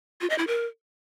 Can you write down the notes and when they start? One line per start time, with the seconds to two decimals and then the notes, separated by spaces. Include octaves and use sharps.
0.21 F4
0.30 D#5
0.38 E4
0.47 A#4